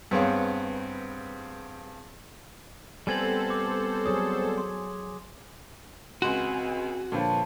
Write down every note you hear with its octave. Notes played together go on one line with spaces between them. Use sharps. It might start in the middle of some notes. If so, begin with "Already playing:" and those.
G2 B3 C4 G#4 C#5 F5
G3 B3 C4 A4 C5 G#5 G#6 F#7
D6
F#3 G#4 C#5 D#6
C6
C#2 C4 F#4 G#5 C6
A#2 D3 F3 A4 B4 C#5 G5 A5